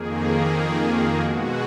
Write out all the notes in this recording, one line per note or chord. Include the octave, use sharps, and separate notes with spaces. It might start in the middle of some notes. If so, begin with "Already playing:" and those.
Already playing: F2 D#3 A#3 G#4
B2 G#3 F#4